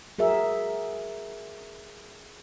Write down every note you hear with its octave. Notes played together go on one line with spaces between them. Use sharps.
F#4 G#4 A#4 E5